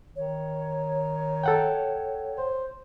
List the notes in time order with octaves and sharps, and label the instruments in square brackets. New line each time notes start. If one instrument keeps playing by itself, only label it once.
[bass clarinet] D#3 [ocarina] C#5
[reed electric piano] A4 F#5 G5
[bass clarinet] C5